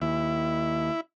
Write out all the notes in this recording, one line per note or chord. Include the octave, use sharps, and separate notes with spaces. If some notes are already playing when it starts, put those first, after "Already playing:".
D#2 E4